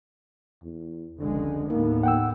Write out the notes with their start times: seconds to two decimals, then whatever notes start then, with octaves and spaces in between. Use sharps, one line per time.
0.63 E2
1.19 F1 C#2 D3 G#3
1.70 D#2 A2 A#3 B3 D#4
2.03 F#5 G5 E6